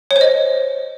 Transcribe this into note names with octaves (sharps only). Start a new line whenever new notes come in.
C#5
C5
D#5